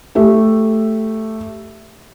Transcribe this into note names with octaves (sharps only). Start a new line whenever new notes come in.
A3 G4 E5